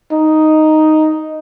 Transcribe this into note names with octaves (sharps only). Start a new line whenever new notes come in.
D#4